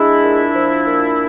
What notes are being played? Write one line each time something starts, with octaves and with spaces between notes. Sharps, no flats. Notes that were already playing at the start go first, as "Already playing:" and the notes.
Already playing: G#3 D4 E4
A#2
F3
A#2